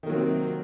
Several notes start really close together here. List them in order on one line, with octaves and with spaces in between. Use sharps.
D#3 A#3 F#3 C3 C4